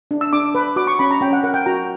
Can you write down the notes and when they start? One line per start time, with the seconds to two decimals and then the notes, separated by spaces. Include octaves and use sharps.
0.11 D4
0.21 E6
0.33 D4 D6
0.55 B4
0.76 F#4 D6
0.87 C#6
0.99 C#4 B5
1.11 A#5
1.21 C#4 G5
1.33 F#5
1.43 A#4 F#5
1.54 G5
1.66 F#4 A#5